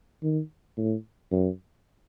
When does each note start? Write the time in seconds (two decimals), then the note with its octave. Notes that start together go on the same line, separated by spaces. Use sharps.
0.23 D#3
0.78 A2
1.32 F#2